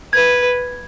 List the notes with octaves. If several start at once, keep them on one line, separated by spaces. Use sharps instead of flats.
B4 G#6